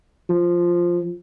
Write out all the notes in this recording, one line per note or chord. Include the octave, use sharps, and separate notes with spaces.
F3